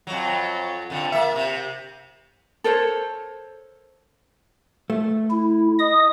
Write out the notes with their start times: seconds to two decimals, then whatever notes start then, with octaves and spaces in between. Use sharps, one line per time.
0.07 F2 F#3
0.90 F2 D3
1.12 A#3 E5
1.36 C3
2.64 A4 A#4 C5 C#5
4.90 A3
5.30 E4
5.79 D#5 D#6